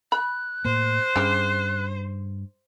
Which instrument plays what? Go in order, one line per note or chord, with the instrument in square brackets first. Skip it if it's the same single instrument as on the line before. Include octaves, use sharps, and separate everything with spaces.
[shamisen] B5 [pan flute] F#6
[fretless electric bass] A2 A#3 [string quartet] C5
[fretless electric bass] G2 [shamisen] C#3 G4